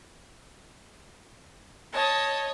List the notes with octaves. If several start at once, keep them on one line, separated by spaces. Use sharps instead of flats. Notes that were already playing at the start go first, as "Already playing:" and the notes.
C#5 D#5 A5